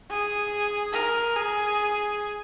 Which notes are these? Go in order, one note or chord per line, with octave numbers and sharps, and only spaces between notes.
G#4
A#4
G#4